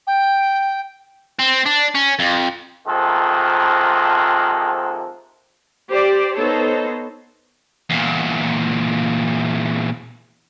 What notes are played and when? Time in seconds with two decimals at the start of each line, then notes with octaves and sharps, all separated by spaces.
0.07 G5
1.39 C4
1.66 D4
1.95 C#4
2.19 F2
2.87 C3 D#3 F3 G#3 A#3 A4
5.90 G4 C5 D5
6.36 B3 D#4 A4 C5 C#5
7.90 E2 A#2